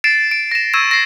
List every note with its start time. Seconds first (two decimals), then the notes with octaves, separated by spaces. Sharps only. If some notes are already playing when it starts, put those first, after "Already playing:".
0.04 A6 C7 D7 E7
0.31 D7
0.51 A#6 E7
0.74 C#6 E6 G#6 D#7 E7
0.91 A#6 C7